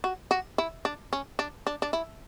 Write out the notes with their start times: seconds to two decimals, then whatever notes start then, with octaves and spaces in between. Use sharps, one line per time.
0.04 F#4
0.31 F#4
0.58 E4
0.85 D4
1.13 C#4
1.39 D4
1.67 D4
1.82 D4
1.93 E4